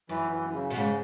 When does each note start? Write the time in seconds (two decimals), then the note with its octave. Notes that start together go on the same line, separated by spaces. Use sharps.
0.09 F#2 E3
0.31 E3
0.49 E3
0.54 C#3
0.70 B2
0.75 G#2 C#3